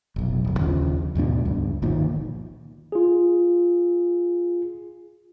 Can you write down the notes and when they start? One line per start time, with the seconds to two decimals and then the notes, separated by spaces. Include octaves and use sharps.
0.16 F1 B1
0.45 D1 G1
0.59 D#2 C#3 F3
1.15 D#2 G#2 B2 D4
1.45 C#2 G2
1.82 G1 A#2 D#3 F3
2.92 F4 G#4